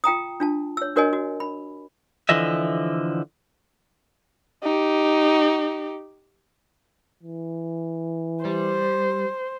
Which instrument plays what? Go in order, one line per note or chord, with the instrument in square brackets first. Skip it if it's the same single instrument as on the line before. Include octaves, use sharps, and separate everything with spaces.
[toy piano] F4 G5 A#5 D#6
D4 F4 A5
C#5 E6
D4 F#4 A#4 C#5 D#5 G#5
F#4
B5
[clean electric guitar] D3 E3 F3 D#5 E5
[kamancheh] D#4 G4
[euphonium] E3
[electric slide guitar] G3 [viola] C5